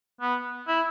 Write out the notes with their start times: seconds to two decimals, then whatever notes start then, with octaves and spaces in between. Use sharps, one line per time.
0.21 B3
0.68 E4